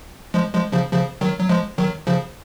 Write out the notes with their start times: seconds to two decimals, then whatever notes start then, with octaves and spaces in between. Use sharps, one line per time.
0.34 F3 G#3
0.53 F3 G#3
0.73 C#3 F3
0.92 C#3 F3
1.21 D#3 F#3
1.40 F#3
1.49 F3 G#3
1.78 D#3 F#3
2.07 C#3 F3